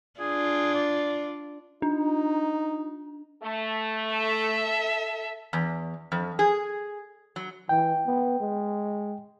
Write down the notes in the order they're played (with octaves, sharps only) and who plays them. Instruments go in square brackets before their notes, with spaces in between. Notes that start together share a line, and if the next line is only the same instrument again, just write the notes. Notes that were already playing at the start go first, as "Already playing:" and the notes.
[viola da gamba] D4 F4 [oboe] G#4
[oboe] D5
[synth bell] D4 [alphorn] D#4
[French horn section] A3
[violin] A4 E5
[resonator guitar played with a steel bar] E2
F2
G#4
F#3
[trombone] E3 [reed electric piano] G5
[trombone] B3
G#3